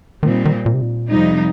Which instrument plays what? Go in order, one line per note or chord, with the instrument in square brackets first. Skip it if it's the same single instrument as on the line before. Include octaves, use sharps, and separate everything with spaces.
[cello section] A#2 G3 C4 D#4 [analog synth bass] D#3
[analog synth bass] D#3
A#2
C3
A#2
[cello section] F2 C3 G3 D#4